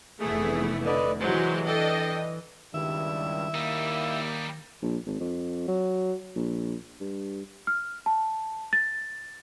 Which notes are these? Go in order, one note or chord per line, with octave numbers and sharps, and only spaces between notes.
F1 E3 A3 B3 E4 G#4
D3 B4 D5 D#5
E3 F#3 G#3 G4 C5
D4 A4 D#5 G5
C#2 G2 D#3 G3 E4 E5
D#2 G3 A#3 D#4
A#1
G#1
F2
F#3
A#1
G2
F6
A5
A6